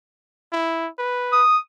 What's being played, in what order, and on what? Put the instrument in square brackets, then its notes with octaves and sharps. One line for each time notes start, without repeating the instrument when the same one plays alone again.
[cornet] E4
B4
[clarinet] D#6